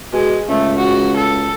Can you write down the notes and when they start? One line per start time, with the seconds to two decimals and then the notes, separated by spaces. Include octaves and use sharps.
0.13 B2 G#3
0.49 C#2 A3
0.78 F#4
1.17 A4